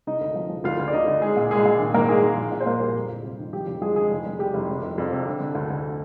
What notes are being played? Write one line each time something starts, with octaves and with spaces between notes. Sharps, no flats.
C3 D#4 D#5
D2
F3
F3
D2 F4 F5
D2
D5
D2 D#4 D#5
D2
G#3 G#4
A#2
C2 G#3 G#4
A#2
D#3
G#1 A#3 A#4
G#2 G#3 G#4
G#1
A#1
A#2
C5
A#2 A#3 A#4
G3
F2
G1
C3
D#3
F3 G4
F1
F3 G#3 G#4
D3 G#3 G#4
F1
F1
G3 G4
F1
C3
F1
F2
C3
D3
D3
D2
D2